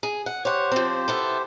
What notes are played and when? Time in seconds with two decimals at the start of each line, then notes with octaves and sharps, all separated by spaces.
0.03 G#4
0.26 F#5
0.45 G4 C5 C#5 F#5
0.72 F3 C4
1.08 B3 E4 A4